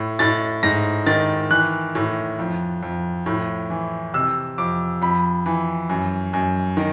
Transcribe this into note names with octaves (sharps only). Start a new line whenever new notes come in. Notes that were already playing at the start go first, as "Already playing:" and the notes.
Already playing: A2
A2 A6
G#2 A#6
D#3 A6
E3 F#6
A2
F2
F2
A2
E3
C3 E6
F2 D6
F2 B5
E3
F#2
F#2
D#3